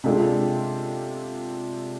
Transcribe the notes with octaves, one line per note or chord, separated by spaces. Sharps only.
C3 G#3 D4 F4 A4